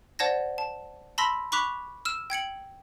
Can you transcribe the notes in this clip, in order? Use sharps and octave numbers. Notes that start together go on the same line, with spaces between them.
C5 D5 F#5 A5 G#6 A#6
A5
A5 B5 C6 E6 A#6 B6
B5 C#6 D6 F#6 B6 F7
E6 F6 E7
G5 G#6 C#7 F#7